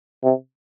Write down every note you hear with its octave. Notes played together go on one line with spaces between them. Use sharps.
C3